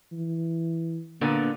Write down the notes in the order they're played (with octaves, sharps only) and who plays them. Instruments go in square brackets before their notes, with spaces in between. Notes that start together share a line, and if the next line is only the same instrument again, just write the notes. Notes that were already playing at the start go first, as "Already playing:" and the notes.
[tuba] E3
[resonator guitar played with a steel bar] A#2 D3 B3 [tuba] A#3